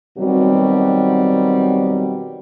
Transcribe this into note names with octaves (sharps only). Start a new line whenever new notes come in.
B2 D#3 F#3 G3 C4 F#4